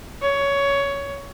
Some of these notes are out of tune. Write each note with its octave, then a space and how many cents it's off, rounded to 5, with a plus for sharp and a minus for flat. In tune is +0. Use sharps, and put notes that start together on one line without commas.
C#5 +15